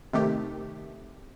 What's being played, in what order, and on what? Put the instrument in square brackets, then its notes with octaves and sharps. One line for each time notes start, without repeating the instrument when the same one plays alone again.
[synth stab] C3 D#3 A3 G4